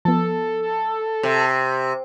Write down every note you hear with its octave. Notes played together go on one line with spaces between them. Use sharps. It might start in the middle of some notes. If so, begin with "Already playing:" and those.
F3 B3 A4
C3